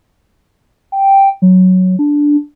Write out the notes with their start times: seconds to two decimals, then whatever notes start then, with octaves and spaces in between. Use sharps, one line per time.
0.92 G5
1.42 F#3
1.99 D4